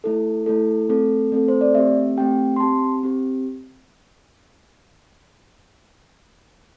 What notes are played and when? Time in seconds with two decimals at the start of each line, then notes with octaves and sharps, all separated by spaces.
0.04 A3 E4 A4
0.46 A3 E4 A4
0.89 A3 C4 A4
1.32 A3 C4 A4
1.48 C5
1.61 D5
1.75 A3 C4 G4 E5
2.17 A3 C4 G4 G5
2.56 C6
2.60 C4 G4 A5
3.03 C4 G4